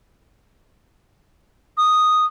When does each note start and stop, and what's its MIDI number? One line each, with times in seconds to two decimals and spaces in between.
1.77 2.25 87